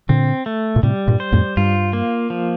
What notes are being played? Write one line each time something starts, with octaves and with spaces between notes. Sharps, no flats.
A#2 D3 C4
A3
A#2
A2 C3 G3
G2 A#2
C5
F2 A2
G2 F4
A#3
F3